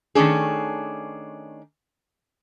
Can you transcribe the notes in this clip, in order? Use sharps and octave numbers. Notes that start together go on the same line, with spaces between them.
D#3 A3 C#4 D4 G#4